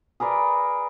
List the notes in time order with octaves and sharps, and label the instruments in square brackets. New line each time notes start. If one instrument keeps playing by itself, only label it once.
[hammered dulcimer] G#4 A#4 B4 D5